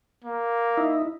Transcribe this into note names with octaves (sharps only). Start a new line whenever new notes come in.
A#3
D#4 E4